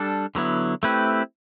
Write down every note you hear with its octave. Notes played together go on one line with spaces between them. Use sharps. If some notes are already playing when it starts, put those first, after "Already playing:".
Already playing: G3 D4 A4
D3 F#3 B3 E4
A3 C4 E4 G4 B4